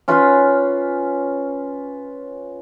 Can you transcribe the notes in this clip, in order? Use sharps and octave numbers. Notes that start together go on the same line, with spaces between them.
C#4 F4 B4